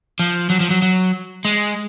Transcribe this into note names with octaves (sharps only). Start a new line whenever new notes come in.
F3
F#3
F3
F#3
F#3
G#3